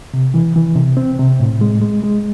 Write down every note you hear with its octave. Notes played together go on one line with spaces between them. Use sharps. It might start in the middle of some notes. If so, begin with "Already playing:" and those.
C3
E3
E3
C3
C4
C3
A2
G#3
G#3
G#3